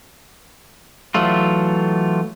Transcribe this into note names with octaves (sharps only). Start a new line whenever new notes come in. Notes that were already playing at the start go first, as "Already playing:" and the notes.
E3 F#3 A3 F4